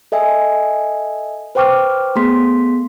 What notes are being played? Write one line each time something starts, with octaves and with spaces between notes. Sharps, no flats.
A4 D#5 E5 G#5
B4 C5 G5 C#6 D6 F6
A3 B3 G#4 A4 C6 B6